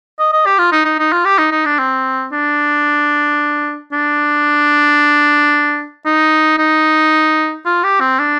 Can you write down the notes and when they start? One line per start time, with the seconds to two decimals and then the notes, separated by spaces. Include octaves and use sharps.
0.19 D#5
0.33 D#5
0.46 G4
0.58 F4
0.72 D#4
0.85 D#4
0.99 D#4
1.12 F4
1.25 G4
1.38 D#4
1.52 D#4
1.65 D4
1.79 C4
2.32 D4
3.92 D4
6.06 D#4
6.58 D#4
7.65 F4
7.84 G4
8.00 C4
8.19 D4